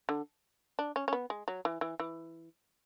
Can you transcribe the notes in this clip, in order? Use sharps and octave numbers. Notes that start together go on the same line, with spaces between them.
D3
D4
C#4
C#4
B3
G#3
F#3
E3
E3
E3